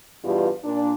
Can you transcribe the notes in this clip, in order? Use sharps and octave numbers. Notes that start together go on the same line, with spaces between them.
E2 G2 B2 G3 F4
A#2 D4